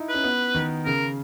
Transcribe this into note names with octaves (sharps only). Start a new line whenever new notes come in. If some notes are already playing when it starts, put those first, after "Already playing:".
Already playing: D#4 E4
B4
C#4
B3
D#3
C#3 A#4